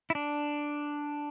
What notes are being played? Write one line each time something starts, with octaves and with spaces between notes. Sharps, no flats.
E4
D4